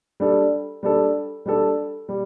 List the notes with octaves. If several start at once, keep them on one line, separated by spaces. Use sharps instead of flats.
G3 D4 A4
G3 D4 A4
G3 D4 A4
G3